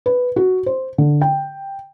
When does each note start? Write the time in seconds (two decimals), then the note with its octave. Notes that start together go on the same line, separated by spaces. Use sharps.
0.06 B4
0.36 F#4
0.66 C5
0.98 D3
1.22 G5